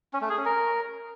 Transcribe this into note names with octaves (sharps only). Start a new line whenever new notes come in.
C#4
A3
G#4
C#4
A#4